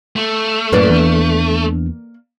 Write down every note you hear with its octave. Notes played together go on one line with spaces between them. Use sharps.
A3
F#2 A2 A#3 B4 D5
E2 E3 D4